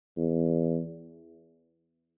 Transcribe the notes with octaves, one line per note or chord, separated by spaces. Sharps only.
E2